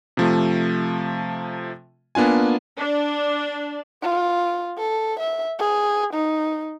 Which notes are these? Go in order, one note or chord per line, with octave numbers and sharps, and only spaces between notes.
C3 F3 A3
A#3 B3 D4 F4 G#5
D4
F4
A4
E5
G#4
D#4